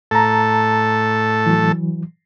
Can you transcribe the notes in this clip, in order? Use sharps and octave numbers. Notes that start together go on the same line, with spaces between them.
A2 A4 A5 A#5
E3 F#3